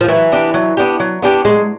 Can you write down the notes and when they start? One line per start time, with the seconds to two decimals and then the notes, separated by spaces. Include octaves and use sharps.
0.01 F3
0.08 E3 F#3
0.32 B3 D4 G4
0.54 F#3
0.77 B3 D4 G4
1.00 F#3
1.22 B3 D4 G4
1.45 F#3 G#3